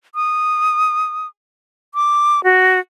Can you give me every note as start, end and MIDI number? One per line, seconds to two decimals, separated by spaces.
0.15 1.27 87
1.95 2.43 86
2.44 2.79 66